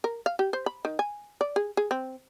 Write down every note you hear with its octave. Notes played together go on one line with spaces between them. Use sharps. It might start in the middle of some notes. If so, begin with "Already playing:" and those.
A#4
F5
G4
C5
B5
D#3
G#5
D5
G#4
G#4
C4